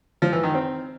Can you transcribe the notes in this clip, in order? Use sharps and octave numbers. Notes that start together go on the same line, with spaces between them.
F3
E3
D#3
C4